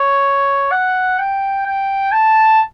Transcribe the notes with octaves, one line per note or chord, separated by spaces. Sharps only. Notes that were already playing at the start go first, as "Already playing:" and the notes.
Already playing: C#5
F#5
G5
G5
A5